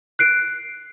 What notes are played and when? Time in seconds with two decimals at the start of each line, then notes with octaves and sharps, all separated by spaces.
0.19 F#6 C7 D7